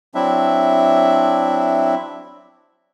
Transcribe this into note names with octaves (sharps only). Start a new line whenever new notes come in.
F#3 C4 D4 E4 E5